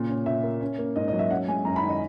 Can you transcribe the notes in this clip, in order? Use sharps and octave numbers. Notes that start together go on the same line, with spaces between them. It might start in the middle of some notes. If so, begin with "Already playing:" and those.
Already playing: A#2 C#3
C#4
A#2 E5
A#3
C#4
A#3
G#2 D#5
D#5
F#3
E5
C#4 F#5
G#3 G#5
F#2 A#5
B5
D#3
D#5